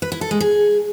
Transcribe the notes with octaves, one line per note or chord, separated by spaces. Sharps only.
B4
E4
A4
G#3
G#4